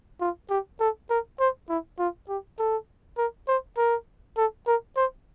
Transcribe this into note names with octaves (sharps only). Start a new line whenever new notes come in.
F4
G4
A4
A#4
C5
E4
F4
G4
A4
A#4
C5
A#4
A4
A#4
C5